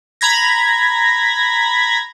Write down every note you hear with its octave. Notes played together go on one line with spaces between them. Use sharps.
A#5 B5 G#6 A#6